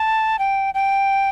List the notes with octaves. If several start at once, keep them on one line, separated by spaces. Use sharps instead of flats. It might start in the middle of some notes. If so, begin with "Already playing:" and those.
Already playing: A5
G5
G5